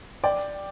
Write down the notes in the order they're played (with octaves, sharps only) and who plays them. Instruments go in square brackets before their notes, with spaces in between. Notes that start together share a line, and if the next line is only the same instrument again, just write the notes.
[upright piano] D5 G5